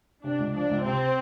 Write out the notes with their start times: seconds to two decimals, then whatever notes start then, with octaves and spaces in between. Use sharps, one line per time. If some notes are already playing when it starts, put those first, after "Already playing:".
0.24 C3 D4
0.39 C#2
0.54 F3 D4
0.69 C#2
0.84 C3 C4